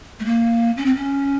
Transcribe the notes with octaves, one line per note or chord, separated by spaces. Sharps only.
A3
A#3
C#4
C4
C#4